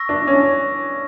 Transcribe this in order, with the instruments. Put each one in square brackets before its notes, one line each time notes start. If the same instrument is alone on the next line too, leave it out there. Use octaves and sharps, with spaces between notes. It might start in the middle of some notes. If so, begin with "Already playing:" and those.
Already playing: [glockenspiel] C#6 E6 A#6
[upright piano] D4
C#4